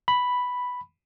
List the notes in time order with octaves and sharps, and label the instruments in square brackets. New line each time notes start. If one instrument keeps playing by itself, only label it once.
[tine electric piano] B5